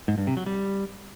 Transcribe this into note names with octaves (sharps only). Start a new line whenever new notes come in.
G#2
G2
C3
F#3
G3